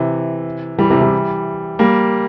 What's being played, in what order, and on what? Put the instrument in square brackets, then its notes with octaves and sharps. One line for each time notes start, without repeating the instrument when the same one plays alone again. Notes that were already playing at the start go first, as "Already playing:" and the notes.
Already playing: [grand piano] C3 E3
E3 G3
C3 E3
E3 G3
G3 A#3